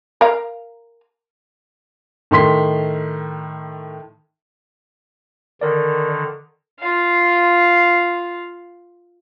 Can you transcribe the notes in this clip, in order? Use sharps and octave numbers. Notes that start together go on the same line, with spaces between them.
A#4 F5
A2 D#3 C6 B6
D3 D#3 A#4 D5
F4 F5